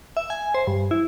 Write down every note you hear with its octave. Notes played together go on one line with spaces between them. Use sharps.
E5
G#5
C5
G2
E4